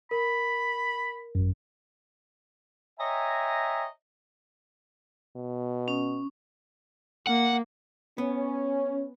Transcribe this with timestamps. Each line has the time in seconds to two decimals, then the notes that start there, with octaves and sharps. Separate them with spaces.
0.11 A#4 B5
1.35 G#1 F#2
2.99 C#5 D#5 E5 G5 G#5 A#5
5.36 B2
5.88 C#4
7.27 A#3 F#5
8.18 B3 C#4